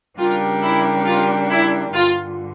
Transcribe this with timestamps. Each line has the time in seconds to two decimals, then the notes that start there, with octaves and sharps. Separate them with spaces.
0.18 C#3 G3 D4 F4 G4 A#4
0.63 E4
1.06 F4
1.50 E4
1.94 G2 D3 G3 F4